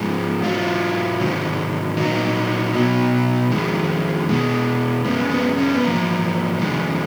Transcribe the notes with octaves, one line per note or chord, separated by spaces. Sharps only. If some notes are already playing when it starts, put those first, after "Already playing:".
Already playing: G#2 F3 G#3
G#2 F#3 F4
G#2 D#3 F#3
A#2 F#3 D#4
B2 F#3
F2 D#3 G#3
B2 G#3
F#2 C#3 G#3 B3
B3
C#4
B3
G#2 F3 A#3
F2 D#3 G#3